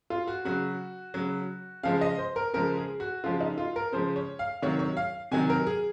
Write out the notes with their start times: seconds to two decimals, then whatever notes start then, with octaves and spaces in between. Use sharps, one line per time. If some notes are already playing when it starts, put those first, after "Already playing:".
0.10 F4
0.27 F#4
0.45 C#3 F#3 F#4
1.14 C#3 F#3
1.83 C#3 F3 G#3 F5
2.01 D#5
2.18 C5
2.36 A#4
2.54 C#3 F3 G#3 A#4
2.77 G#4
3.00 F#4
3.24 C#3 F3 G#3 F4
3.41 D#4
3.58 F4
3.76 A#4
3.92 C#3 F3 G#3 C5
4.16 C#5
4.39 F5
4.62 C3 D#3 F#3 C#5
4.79 C#5
4.97 F5
5.31 C3 D#3 F#3 G#5
5.50 A#4
5.67 G#4